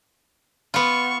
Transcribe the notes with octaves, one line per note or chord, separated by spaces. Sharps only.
B3 F4 C#6